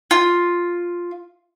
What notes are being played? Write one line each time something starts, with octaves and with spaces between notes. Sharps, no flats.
F4